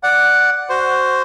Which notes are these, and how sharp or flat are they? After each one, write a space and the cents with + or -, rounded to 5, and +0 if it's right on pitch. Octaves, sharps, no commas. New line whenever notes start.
D5 +0 F#5 +0
F#4 +10 C5 +0